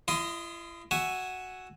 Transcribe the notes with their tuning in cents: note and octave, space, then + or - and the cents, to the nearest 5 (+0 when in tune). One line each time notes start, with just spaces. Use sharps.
E4 +45 D#5 +0 C6 +0
F#4 +0 E5 +0 G#5 +0